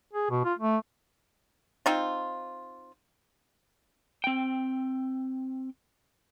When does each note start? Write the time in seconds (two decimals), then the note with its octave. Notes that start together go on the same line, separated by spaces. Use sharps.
0.13 G#4
0.30 B2
0.45 F4
0.58 A3
1.86 C4 D#4 F4
4.24 C4 G5